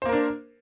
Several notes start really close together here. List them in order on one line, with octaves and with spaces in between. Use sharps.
C5 A#3 A#4 D4